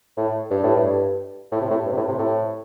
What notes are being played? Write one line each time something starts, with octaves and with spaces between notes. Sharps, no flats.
A2
G2
A2
G2
A2
C3
A2
G2
C3
A2
C3
A2